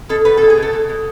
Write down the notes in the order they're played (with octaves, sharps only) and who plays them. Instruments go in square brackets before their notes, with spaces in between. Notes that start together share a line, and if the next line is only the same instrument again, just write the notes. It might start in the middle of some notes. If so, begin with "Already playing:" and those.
[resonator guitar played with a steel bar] B2 A4
B2 B4
B2 A4
G#4
B2
A4
B2
B2